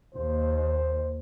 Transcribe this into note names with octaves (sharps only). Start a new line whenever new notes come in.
D#2 C5